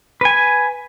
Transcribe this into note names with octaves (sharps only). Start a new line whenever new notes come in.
B4 G#5